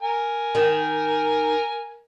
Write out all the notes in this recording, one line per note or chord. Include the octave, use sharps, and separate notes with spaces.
A#4 G#5
D#3